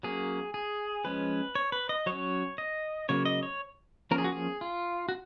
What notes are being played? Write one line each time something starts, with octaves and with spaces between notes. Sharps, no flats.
F#3 A#3 C#4 G#4
G#4
F3 G#3 C#4 B4
C#5
B4
D#5
F#3 C#5
C#4
D#5
C#3 F#3 A#3 C#5
D#5
C#5
F3 A#3 C#4 A#4
G#4
F#4
G#4
F4
F#4